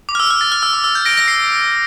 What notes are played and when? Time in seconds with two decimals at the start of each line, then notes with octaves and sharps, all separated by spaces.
0.09 D6
0.15 F6
0.20 E6
0.30 F6
0.41 A6
0.52 F6
0.63 E6
0.73 D6
0.84 E6
0.95 G6
1.05 A#6 D7
1.17 A#6
1.28 C7